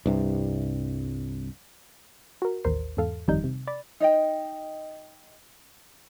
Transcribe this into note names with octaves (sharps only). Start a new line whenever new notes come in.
C2 G2 C3
F#4 A#4
A1 D#2 A#4 C5 C7
E2 G#2 A4 F5
G1 F2 D#3 G3 D#4 G6
C3
D5 B5 A6
D#4 D#5 G5